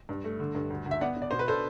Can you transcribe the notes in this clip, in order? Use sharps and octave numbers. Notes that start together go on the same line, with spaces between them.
G2
A3
D3
G2
D2
D2
E5
B3 D5 F#5
B3
D5
B2 C5
B4
D4 A4 C5